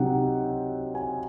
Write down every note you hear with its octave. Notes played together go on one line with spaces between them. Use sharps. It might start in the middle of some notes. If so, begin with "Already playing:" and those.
Already playing: C3 F#3 C4 D#4 F#5
G#5